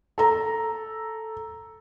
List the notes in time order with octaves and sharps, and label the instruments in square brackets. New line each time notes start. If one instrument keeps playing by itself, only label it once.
[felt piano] A4 A#5